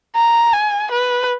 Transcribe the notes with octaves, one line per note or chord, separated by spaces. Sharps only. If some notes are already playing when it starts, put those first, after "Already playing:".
A#5
G#5
B4